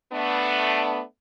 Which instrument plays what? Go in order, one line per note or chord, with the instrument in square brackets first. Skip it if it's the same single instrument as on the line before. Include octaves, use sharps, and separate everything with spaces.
[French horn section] A3 B3 D4